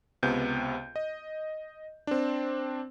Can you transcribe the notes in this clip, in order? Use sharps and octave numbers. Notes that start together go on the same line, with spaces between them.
C#2 C3 B3 G6
D#5
C4 D4